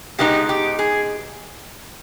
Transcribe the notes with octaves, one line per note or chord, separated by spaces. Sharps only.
B2 G#3 B3 D#4 G4
G4
G#4